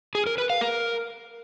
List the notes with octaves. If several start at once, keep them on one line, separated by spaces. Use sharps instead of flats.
G#4
A#4
B4
F5
A#4